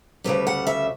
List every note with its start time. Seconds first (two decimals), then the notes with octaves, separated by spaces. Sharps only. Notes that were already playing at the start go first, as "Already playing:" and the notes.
0.24 D2 C#3 G3 B4
0.47 F#5
0.67 E5